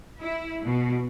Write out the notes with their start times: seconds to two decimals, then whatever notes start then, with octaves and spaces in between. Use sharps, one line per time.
0.19 E4
0.63 B2